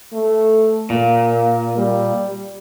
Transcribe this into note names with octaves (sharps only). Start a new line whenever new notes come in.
A3
A#2 A#3
G3